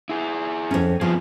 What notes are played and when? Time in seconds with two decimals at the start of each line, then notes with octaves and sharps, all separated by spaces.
0.09 E4 G#4
0.71 F2 C#4
1.01 F3 B3 C4 G#4